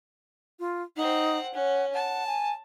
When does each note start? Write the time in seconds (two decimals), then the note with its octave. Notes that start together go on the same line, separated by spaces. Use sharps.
0.60 F4
0.96 C4 D#4 F#5
1.54 C#4 F#5
1.94 F#5 A5
2.27 G#5